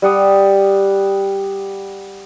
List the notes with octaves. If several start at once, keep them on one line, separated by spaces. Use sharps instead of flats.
G3 F#5 D#6